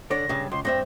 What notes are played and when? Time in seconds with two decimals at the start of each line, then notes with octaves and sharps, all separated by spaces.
0.11 D3 C#5 D5 A#6
0.29 G2 C#3
0.52 C#2 C6
0.65 G2 C4 E5 A#6